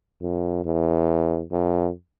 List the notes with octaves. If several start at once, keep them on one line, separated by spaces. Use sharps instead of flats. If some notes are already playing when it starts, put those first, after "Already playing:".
F2
E2
F2